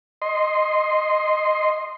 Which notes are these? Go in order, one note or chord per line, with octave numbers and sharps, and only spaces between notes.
D#5 C6